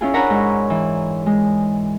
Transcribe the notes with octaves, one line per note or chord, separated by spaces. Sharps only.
C#4 E4 F4 G#4
D4 A#4 C#5 F#5 A#5 B5
G#2
E3
G#3